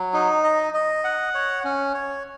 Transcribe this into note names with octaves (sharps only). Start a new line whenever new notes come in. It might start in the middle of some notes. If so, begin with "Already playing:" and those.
Already playing: F#3
D#4
D#5
D#5
F#5
C#5
C#4
C#5